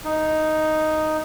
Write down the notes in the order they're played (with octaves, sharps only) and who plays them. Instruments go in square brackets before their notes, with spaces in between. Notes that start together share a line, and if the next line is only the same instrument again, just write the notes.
[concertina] D#4